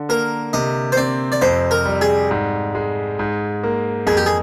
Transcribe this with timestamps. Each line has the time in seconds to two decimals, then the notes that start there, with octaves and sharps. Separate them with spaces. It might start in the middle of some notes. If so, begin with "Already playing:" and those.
Already playing: D3
0.09 A#3 A#4
0.53 C3 D#5
0.92 C5
0.97 C4 D5
1.32 D5
1.41 F2 C5
1.71 A#4
1.86 G3
2.01 G#4
2.31 G#2
2.75 G#3
3.19 G#2
3.63 A#3
4.07 F2 G#4
4.17 G4
4.26 G#4